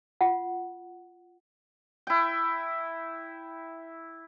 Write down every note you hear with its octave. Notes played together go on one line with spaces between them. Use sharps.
F4 F#5
E4 G5